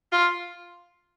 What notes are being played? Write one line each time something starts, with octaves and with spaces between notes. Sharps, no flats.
F4